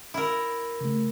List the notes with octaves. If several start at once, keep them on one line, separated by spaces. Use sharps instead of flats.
E4 A#4
C#3 A3